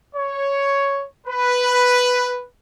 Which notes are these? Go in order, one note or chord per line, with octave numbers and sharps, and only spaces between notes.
C#5
B4